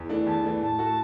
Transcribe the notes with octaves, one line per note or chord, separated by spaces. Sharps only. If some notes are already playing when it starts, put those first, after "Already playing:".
Already playing: E2
E3 A3 D4
E2 A5
E3 A3 D4
A2 A5
A3 F#4 A4